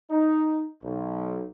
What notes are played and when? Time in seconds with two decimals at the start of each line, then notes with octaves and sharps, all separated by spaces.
0.10 D#4
0.83 B1